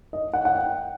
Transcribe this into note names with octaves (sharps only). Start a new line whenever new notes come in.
D#5
F#5
F#5
G5